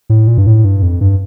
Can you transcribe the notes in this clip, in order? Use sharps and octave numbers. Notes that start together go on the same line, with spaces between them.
A2
A#2
G2
A2
G2
F2
G2